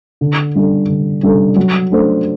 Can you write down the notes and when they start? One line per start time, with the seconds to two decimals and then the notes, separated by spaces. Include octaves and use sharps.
0.21 D3
0.55 G3 D4 A4
0.89 D3
1.23 G3 D4 A4
1.56 F#3
1.91 A3 D4 A4 C5